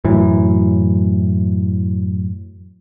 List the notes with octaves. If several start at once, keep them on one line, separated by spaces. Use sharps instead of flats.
F#2 A2 E3